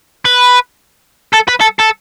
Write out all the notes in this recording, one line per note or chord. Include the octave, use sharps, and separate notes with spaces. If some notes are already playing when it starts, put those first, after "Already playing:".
B4
A4
B4
A4
A4